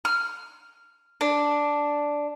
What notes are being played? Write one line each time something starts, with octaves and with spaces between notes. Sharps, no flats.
F6
D4